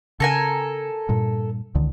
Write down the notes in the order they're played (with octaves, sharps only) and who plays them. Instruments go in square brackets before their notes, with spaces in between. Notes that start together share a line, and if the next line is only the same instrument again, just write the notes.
[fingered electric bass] C#3 [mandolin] A4 A#4 G#5
[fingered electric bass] G2 A#2
C#2 D3 D#3